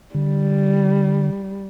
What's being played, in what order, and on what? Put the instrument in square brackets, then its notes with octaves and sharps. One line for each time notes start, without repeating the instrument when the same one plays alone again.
[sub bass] D3 [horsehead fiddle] G3